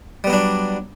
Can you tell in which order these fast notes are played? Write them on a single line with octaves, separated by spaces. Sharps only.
G3 B3 F#3 D4